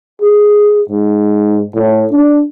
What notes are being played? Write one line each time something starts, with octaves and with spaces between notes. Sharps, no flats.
G#4
G#2
A2
D4